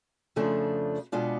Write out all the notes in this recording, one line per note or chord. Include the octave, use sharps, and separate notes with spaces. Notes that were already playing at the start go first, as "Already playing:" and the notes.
F2 C#3 F3 A3 D4
B2 G#3 B3 D4 F4